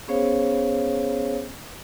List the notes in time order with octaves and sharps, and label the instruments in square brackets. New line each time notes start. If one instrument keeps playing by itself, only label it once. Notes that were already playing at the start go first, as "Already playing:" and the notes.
[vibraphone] B3 C#4 G#4 C5 C#5 F5